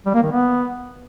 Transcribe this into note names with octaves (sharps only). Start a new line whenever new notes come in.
G3
A#3
D#3
B3